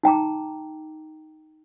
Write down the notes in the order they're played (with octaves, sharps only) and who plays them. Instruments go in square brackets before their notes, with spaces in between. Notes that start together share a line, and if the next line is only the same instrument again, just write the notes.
[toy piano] D#4 G5 A#5 D6